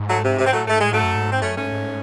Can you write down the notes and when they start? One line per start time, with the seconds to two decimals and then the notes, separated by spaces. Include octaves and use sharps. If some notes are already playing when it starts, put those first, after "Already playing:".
Already playing: G#2
0.08 F#3 A3
0.23 C3
0.38 C3
0.46 C4
0.52 A2 F#3 A3
0.67 G#2 A3
0.80 A2 G#3
0.93 G#2 F#3 A3
1.03 F#2
1.15 G#2
1.32 C4
1.42 F#2 A3 C#4
1.57 G#2 A3 C#4
1.72 G#2